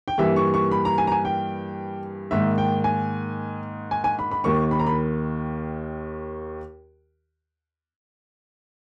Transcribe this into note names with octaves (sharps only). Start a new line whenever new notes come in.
G5
G2 E3 G3 A#3 E5
C#6
C#6
B5
A#5
G#5
A#5
G#5
G5
G#2 D#3 A#3 E5
G5
G#5
G#5
G#5
B5
B5
D#2 D#3 A#3 C#6
B5
A#5
B5